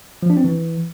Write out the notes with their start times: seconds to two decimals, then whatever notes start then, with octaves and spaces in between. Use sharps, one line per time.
0.23 F3
0.30 D4
0.37 C4
0.44 E3